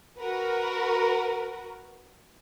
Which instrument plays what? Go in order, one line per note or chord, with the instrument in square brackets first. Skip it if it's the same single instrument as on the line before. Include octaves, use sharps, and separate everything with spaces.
[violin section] F#4 A#4 B4